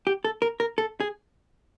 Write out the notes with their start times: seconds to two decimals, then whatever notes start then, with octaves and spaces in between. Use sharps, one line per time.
0.07 G4
0.24 A4
0.42 A#4
0.60 A#4
0.78 A4
1.00 G#4